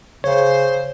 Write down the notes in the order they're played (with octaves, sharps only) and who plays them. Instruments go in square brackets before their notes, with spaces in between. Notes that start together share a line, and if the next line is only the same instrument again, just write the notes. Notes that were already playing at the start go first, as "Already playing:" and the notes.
[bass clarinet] C#3 [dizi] C5 [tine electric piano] C#5